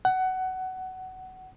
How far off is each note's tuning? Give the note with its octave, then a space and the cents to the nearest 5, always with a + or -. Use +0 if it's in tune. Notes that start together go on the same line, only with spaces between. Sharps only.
F#5 +20